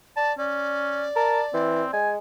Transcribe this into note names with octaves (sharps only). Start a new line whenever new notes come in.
D5 A5
C#4 D5
A#4 A5
E3 C4
G#3 G#5